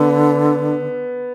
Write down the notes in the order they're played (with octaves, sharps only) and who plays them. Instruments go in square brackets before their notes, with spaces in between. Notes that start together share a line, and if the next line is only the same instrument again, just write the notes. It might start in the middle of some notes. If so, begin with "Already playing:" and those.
Already playing: [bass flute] D3 [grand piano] B3